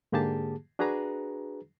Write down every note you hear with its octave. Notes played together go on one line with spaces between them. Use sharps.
G#2 D3 A#3 G4 G#4 A5
D4 F#4 G#4 B4 A#5